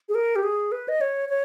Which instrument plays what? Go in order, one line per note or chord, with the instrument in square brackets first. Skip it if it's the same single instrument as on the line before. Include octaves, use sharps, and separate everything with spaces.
[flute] G#4
A#4
G4
G#4
B4
D#5
C#5
C#5